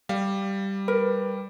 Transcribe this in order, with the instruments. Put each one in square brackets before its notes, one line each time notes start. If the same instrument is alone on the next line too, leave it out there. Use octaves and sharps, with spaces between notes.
[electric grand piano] G3 [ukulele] F5
[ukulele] A#4 [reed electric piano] B4